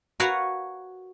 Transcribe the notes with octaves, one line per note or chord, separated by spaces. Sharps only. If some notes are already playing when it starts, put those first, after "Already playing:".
F#4 A#4 B4 C#5 F5 F#5